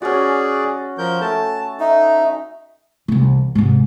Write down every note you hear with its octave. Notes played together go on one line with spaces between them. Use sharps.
C#4 F#4 G#4 D5
F3 A#4 G6
A3 A5
D#4 E5
C2 E3
G#2 C3